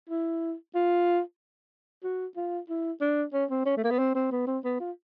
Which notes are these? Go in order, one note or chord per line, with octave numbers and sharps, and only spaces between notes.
E4
F4
F#4
F4
E4
D4
C#4
C4
C#4
A3
A#3
B3
C4
C4
B3
C4
B3
F4